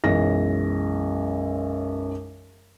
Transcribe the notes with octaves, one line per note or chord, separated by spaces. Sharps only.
B1 F#2 E3 G#3 A#6